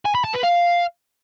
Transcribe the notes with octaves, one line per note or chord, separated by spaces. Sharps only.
G#5
B5
A5
B4
F5